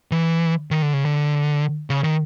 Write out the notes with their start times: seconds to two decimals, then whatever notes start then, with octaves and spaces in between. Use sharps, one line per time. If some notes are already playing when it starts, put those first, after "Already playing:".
0.12 E3
0.71 D#3
0.82 D3
0.93 C#3
1.05 D3
1.90 C#3
2.04 D#3